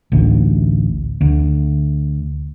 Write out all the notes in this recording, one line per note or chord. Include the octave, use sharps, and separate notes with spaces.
A1 D2
D2